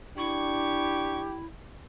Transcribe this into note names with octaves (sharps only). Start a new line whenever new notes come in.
D4 E4 G4 C#6